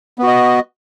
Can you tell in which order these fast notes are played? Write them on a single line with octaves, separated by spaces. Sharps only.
B3 F#4 D#5